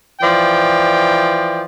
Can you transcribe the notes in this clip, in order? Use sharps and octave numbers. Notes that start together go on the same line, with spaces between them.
E3 F3 D5 G5